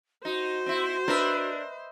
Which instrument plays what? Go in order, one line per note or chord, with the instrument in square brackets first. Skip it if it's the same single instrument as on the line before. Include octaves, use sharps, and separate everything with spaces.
[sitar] D#4 [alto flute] F#4 [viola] C5
[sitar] C4 E4
[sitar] D4 A#4 [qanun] B4 D#5 E5